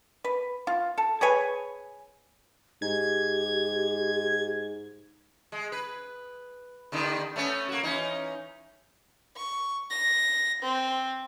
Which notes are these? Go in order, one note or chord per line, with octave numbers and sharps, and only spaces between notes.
B4
F4
A4
G#4 B4 C#5 G#5
G#2 G4 G#6
G#3
B4
D#2 D3 D#3
A3 B3 C#4
A#3 F#4
E3 C#4 D#4
C#6
A#6
C4